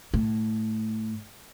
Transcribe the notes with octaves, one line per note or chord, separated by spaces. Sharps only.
A2